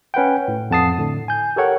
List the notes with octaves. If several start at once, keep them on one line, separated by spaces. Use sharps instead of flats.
C#4 B4 F#5 G5
A2
F2 F#5 A5 D#6 C7
A2 D3
G#5 G6
G4 A4 A#4 C#5 F#5 G5